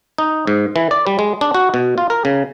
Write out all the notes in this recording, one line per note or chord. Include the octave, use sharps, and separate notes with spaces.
D#4
G#2
E3
D5
G3
G#3
D4
F#4
B2
F4
A#4
C#3